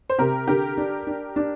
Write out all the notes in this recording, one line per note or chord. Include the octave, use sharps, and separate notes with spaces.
C5
C3 G4 A#4
D3 G4 A#4
D4
D4
D4